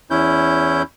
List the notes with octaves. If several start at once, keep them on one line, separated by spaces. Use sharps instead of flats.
E2 C#4 E4 G6